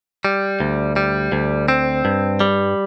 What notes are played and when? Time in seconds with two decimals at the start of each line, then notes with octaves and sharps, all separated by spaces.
0.25 G3
0.60 D2
0.96 G3
1.32 D2
1.68 C4
2.05 G2
2.40 G3